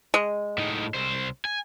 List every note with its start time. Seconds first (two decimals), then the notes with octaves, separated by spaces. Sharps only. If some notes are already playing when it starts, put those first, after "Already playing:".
0.14 G#3
0.58 A2 D#4
0.94 C2 C5
1.45 G#5